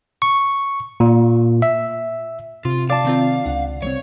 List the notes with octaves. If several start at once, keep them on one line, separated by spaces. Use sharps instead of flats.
C#6
A#2
E5
C3 F4
D5 F5 A5
D#3 C4 F4
C#2 D4 F#5
C2 F3 C4 C#5